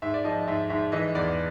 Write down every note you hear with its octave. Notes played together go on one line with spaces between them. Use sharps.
G#2 E5
D5
F3 D#5
G#2 E5
G#2 E5
E3 D#5
E2 D5